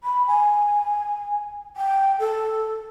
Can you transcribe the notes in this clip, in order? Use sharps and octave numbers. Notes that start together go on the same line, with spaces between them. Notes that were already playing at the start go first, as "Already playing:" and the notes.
B5
G#5
G5
A4